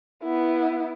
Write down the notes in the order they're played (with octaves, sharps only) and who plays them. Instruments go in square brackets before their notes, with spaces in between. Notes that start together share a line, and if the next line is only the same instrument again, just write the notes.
[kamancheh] B3 E4